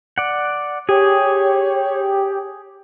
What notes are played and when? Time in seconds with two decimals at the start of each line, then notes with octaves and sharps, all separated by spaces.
0.18 D5 F#5
0.89 G4 G#4 C#5